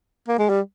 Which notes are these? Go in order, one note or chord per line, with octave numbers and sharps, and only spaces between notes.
A#3
G#3
G3